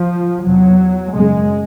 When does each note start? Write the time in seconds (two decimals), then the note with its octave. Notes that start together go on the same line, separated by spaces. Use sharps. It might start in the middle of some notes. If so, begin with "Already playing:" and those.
Already playing: F3
0.45 E2 C3 F#3
1.15 F#2 C#3 G#3